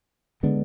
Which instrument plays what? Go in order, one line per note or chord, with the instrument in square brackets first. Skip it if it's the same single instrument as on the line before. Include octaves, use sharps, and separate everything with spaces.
[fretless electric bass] D3 G#3 B3 D4